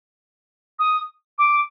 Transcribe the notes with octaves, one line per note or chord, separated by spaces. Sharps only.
D#6
D6